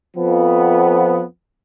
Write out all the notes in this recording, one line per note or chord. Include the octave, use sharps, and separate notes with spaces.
F2 F3 B3